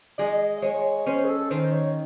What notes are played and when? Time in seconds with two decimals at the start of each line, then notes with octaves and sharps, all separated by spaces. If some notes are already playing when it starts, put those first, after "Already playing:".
0.18 G#3 D#5
0.58 D#5
0.62 G#3 C#5
1.07 C#4 C5
1.24 G#4
1.29 A4
1.50 D#3 C5
1.72 C#5